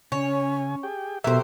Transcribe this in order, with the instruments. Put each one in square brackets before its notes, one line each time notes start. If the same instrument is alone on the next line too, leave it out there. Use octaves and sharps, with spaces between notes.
[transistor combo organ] C#3 G#5 [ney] C#4 [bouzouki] C#5
[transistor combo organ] G4 G#4 G5
[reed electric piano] B2 E5 [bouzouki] F#3 G4 C5 [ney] A4 [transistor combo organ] A#4